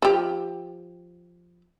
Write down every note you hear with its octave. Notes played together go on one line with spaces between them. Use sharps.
F3 G4